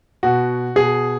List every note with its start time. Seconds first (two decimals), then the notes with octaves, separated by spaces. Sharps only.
0.23 B2 F#4
0.76 B2 G#4